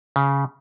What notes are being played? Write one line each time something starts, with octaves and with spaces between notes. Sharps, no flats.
C#3